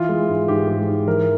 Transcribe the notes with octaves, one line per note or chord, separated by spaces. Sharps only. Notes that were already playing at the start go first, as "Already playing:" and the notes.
Already playing: E3 F4
G#3
G#2
G#2 G4
G#3
G#2
E3 A#4